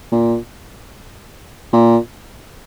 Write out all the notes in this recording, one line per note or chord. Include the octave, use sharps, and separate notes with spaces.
A#2
A#2